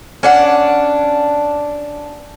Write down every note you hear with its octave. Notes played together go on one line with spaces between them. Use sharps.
C#4 D4 F#5